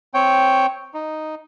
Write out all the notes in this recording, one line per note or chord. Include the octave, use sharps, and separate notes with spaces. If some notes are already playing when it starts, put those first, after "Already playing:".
C4 C#5 G5
D#4